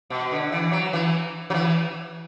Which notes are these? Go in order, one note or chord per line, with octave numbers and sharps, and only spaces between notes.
B2
D3
E3
F#3
E3
F#3
E3